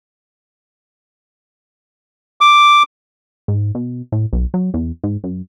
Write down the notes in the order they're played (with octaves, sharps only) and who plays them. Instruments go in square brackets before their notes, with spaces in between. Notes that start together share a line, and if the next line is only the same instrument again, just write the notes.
[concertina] D6
[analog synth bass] G#2
B2
A2
B1
F#3
E2
G#2
F#2